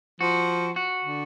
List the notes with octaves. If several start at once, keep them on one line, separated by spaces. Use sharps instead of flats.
F3 F#4
F#4
D3